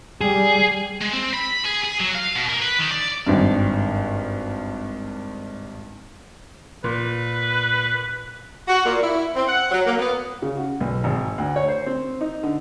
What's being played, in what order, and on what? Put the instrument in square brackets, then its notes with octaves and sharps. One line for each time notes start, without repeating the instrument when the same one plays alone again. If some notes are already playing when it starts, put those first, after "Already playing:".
[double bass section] G3 [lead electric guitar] G#4
[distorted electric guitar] G#3
C4
B5
G#4
G#4
F#3
F5
B2
A#3
B4
D#3
D5
[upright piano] G#1 G2
[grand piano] A#2 [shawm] B4
[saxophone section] F#4
A#2
E4
C4
F#5
F#3
A#3
B3
[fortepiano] C#3
F#4
B1
G#1
D2
C#5
C5
C4
D#4
D3